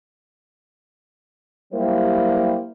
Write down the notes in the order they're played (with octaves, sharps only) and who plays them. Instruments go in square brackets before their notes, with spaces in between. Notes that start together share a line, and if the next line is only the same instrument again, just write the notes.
[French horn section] F#3 G3 A#3 E4 G4 C5